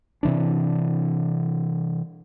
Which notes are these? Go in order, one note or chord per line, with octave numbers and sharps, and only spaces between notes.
C3 E3 D4